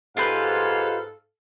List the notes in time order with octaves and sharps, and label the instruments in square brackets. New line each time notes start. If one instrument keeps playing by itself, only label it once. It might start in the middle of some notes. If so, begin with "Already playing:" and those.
[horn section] G#2 A4 F5 [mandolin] F4 G4 B4